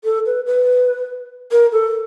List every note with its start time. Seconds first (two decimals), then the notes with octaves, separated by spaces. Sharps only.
0.04 A4
0.26 B4
0.46 B4
1.52 A#4
1.72 A4